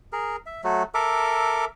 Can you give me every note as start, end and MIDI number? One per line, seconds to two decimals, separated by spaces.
0.13 0.36 68
0.13 0.36 70
0.46 0.61 76
0.64 0.83 54
0.64 0.83 57
0.94 1.65 69
0.94 1.65 70
0.94 1.65 76
0.94 1.65 86